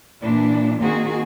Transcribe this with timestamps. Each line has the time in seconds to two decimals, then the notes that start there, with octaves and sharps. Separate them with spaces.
0.23 A#2 E3 D4
0.81 D#3 A#3 C4 F#4 G#4